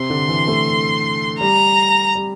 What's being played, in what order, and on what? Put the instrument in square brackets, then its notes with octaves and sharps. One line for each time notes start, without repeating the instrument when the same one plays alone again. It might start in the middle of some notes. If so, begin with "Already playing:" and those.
Already playing: [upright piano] C3 [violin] C6
[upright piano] D3
E3
A3
[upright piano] G3 [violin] A#5
[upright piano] G3